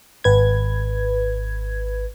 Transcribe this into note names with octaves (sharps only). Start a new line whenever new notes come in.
G#1 B4 G#6